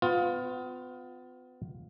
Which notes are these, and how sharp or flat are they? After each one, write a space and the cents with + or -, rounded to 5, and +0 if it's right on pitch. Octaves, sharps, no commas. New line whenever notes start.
B3 +35 F4 +20